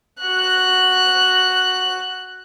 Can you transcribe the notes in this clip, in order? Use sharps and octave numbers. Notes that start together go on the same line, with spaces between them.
F#4 F#6